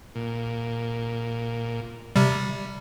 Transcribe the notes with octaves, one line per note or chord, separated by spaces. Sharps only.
A#2
C3 G3